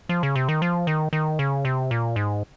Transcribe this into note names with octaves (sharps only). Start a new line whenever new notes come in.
F3
C#3
C3
D#3
F3
D#3
D#3
C#3
C3
A#2
G#2